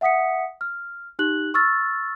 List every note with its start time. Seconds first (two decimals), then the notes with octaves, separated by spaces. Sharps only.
0.01 E5 F#5 D#6 B6 C#7
0.61 F6
1.19 D#4 G4 F#6 F#7
1.54 C#6 E6 F6 A6